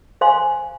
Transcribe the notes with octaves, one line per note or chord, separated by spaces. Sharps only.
C5 F5 G#5 C6